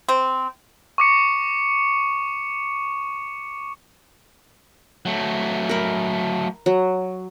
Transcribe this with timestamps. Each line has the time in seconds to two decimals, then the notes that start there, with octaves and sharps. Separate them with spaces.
0.09 C4
0.98 C#6 D6 C#7
5.06 F#3 A3
5.69 A#4 B5
6.66 F#3